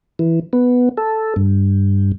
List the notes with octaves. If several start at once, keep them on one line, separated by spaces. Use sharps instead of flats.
E3
B3
A4
G2